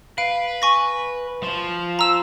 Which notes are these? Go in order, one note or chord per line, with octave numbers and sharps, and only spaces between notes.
B4 F5 D7
G#5 C#6 A#6
F3
A#5 E6 E7